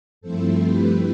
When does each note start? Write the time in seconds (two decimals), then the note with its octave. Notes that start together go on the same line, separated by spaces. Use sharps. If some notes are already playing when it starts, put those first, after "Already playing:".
0.21 G2 F3 A3 C4 E4 A4 C5
0.63 G4 B4